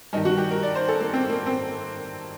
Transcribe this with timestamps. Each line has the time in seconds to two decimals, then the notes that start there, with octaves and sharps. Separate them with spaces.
0.13 G2 D#4
0.17 D#3
0.25 F#4
0.38 G4
0.51 A#4
0.63 D5
0.75 C5
0.89 A4
1.00 A#3
1.13 C4
1.30 A#3
1.46 C4